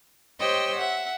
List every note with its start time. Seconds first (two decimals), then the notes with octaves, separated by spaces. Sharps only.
0.39 G4 C5 C#5 D#5 G5 E6
0.76 E5 F#5